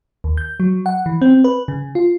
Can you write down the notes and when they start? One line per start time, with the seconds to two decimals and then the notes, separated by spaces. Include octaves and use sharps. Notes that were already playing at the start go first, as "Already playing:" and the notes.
0.24 D#2
0.37 G6
0.60 F#3
0.86 F#5
1.06 E3
1.22 C4
1.44 B4
1.68 C#3
1.95 F4